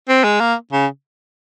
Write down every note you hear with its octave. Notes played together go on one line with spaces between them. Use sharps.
C4
G#3
A#3
C#3